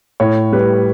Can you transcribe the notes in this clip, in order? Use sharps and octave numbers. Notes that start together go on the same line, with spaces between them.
A2 C#5
G3 B4